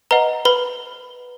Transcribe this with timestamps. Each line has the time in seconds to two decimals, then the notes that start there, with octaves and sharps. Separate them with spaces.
0.11 B4 D#5 F#5 A#5
0.45 B4 B5